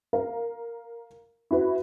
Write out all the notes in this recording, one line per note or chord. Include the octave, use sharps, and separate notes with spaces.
A#4 F5
E4 F#4 B4